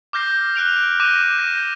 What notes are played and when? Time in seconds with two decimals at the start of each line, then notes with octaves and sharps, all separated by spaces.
0.13 D6 F6 G6 A#6 C7
0.55 F6 F#6 D7 F7
1.00 D6 F6 F#6 A#6 D#7 E7
1.38 G6 A#6 D#7